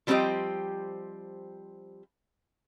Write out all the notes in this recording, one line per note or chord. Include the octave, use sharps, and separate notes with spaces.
F3 G3 C4 D4 G4 D#5